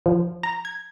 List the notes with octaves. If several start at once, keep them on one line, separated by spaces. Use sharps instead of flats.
F3
A#5
G#6